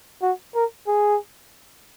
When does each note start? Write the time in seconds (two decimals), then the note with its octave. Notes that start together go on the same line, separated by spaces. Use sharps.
0.22 F#4
0.55 A#4
0.87 G#4